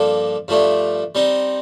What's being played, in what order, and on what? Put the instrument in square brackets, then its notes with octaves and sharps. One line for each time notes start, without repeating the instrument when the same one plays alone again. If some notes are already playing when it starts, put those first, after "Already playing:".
Already playing: [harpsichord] G2 F3 A#3 D4 A4
G2 F3 A3 D4
G3 C4 D#4